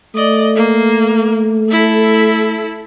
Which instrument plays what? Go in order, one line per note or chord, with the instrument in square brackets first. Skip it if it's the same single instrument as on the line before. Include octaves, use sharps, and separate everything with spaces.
[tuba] A3 [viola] D5 D#5
[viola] A#3
E4 A4